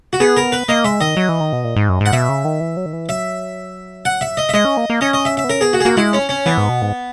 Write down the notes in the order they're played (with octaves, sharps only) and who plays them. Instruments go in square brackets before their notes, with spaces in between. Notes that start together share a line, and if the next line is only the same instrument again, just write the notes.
[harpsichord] F#4
[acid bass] B3 [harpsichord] G#4
[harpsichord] A#4
B4
[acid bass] A#3 [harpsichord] D#5
[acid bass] G#3 [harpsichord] E5
[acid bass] D#3 [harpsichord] D#5
[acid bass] F#3
E3
D#3
B2
A#2
G#2
F#2
[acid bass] G#2 [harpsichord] F#5
[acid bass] B2 [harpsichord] E5
[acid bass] C#3
D#3
E3
F#3
D#3
E3
[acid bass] F#3 [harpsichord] E5
[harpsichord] F#5
E5
D#5
E5
[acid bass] G#3 [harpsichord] D#5
[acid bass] C#4
A#3
A#3
[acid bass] C#4 [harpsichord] D#5
[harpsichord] D#5
E5
E5
[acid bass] B3
[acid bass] C#4 [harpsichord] A#4
[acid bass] B3 [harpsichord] G#4
[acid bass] A#3 [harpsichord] F#4
[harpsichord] G#4
[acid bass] A#3 [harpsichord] F#4
[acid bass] G#3 [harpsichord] E4
[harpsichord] C#4
C#4
[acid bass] E3 [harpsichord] B3
[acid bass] G#2
B2
G#2